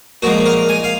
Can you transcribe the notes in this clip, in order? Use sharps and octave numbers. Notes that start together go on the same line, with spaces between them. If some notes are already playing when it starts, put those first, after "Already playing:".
A#2 F3 G#3 F#4
A#4
G#5
F5